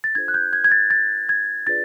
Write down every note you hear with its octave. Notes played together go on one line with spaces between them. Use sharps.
A6
D4 F4 A4 C5 G#6
F#6
G6
G#6
G#6
A6
A6
G#6
D4 F4 G#4 B4 D5 A6